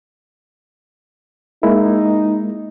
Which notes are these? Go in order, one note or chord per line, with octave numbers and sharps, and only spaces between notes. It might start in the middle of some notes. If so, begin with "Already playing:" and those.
G#3 A#3 D#4 E4